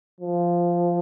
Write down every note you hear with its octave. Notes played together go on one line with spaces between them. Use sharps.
F3